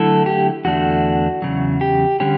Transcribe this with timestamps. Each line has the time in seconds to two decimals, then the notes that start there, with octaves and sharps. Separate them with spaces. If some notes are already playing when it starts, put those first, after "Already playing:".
Already playing: D3 F#3 A3 E4 A4
0.26 G4
0.65 E2 D3 A3 D4 F#4
1.42 E2 C#3 F#3
1.81 G4
2.20 D3 G3 C#4 G4